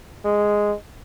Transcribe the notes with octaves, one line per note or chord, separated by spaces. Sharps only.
G#3